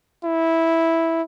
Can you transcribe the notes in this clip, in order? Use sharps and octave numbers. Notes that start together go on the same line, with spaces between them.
E4